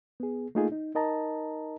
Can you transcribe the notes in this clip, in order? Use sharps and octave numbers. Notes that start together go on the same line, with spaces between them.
B3 G#4
A3 A#3 D#4 F4 G#4
D#4
D#4 A#4 D#5 A5 A#5